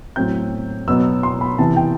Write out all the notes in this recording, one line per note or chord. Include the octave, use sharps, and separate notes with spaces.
A2 F#3 C4 G6
B2 F#3 B3 E6
C6
B5
C3 E3 B3 A5
G5